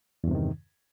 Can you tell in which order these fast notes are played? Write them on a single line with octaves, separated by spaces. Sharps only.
E2 G2 C3 D#3